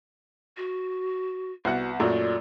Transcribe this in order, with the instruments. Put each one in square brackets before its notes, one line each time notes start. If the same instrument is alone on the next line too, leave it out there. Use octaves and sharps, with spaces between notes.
[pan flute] F#4
[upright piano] C2 B3 F#5 [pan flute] F#4
[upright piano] F#2 A#2 A3 [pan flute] D5